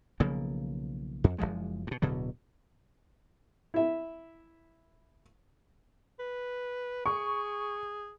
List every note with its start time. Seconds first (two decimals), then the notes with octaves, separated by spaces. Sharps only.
0.20 B1 C#3 F3 A#3
1.24 F2
1.38 F#1 D2 F3 G#3
1.87 G2 B2
2.02 D1 B2 D3 F#3
3.74 E4 E5
6.20 B4
7.06 G#4 C#6